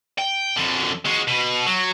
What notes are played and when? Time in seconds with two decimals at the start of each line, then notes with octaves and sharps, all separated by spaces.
0.18 G5
0.56 F2 D3
1.05 G#3 F#4
1.27 B2
1.66 F#3